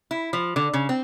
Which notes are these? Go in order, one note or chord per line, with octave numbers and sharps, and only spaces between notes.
E4
F3
D3
C#3
C4